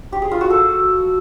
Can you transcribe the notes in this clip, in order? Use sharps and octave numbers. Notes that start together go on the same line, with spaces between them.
G4
G#4
F4
F#4
A4